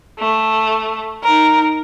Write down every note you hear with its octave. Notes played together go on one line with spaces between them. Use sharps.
A3
D#4 A#4